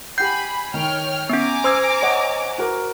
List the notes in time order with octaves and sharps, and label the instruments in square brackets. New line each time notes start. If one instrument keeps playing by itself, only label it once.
[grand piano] G4 F#5 [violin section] G#5 B5 [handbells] G6 C7
[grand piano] D#3 [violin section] C#5 G5 F6
[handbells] B3 C#4 [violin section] G#5 A#5 D6
[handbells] C5 E6 G#6 [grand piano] C6 D#6
[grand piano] C#5 D#5 F#5
F#4 A#4